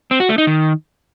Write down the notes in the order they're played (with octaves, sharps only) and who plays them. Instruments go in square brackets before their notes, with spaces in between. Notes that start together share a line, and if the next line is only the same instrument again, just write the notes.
[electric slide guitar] C4
F#4
A3
D#4
D#3